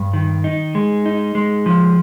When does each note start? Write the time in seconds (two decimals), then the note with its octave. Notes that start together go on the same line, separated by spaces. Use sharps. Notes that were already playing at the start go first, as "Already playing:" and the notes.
Already playing: G2
0.14 D#3
0.44 D#4
0.75 G#3
1.06 D#4
1.35 G#3
1.66 F3